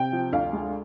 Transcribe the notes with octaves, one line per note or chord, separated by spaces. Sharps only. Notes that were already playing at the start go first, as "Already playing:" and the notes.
Already playing: C3 G5
F3
D2 F5
G#3